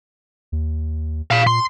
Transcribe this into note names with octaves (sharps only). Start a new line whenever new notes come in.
D#2
A#2 F5 B5
C6